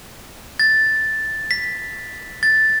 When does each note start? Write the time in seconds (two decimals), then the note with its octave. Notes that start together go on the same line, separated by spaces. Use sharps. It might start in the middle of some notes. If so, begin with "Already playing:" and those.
0.60 A6
1.51 B6
2.43 A6